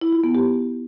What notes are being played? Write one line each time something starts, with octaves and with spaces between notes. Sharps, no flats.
E4
F4
B3
G4